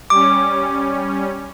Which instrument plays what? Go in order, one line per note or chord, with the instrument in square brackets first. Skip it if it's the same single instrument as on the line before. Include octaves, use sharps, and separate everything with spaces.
[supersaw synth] G3 C#4 [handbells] D6